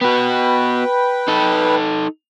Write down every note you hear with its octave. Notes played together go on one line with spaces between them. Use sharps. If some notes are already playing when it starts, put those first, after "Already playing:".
B3 F#4 B4 G5
D#4 A4